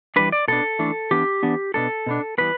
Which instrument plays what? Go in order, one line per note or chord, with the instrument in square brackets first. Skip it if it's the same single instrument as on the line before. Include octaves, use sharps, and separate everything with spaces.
[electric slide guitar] E3 G3 D4 B4
D5
B2 B3 D4 A4
E3 A3 D4
E3 B3 D4 G4
E3 B3 D4
B2 B3 D4 A4
B2 B3 D4
E3 G3 B3 B4